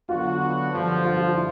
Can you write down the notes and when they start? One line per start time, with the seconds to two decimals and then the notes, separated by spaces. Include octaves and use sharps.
0.09 D3 F#3 B3 D4 F4 F#4
0.73 G2 D3 F3
1.04 F4
1.20 F4
1.36 E4